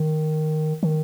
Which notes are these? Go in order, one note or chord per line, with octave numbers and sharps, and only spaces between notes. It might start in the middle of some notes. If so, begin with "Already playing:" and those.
Already playing: D#3
D#3